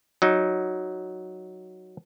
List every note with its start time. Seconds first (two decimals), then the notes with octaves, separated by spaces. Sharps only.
0.22 F#3 D#4